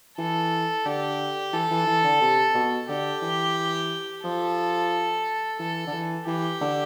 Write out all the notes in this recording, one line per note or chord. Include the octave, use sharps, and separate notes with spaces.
E3 A4
D3 G4
E3 A4
E3
E3
D3
C3
B2
D3 G4
E3
F3 A4
E3 A4
D3
E3
E3 G4
D3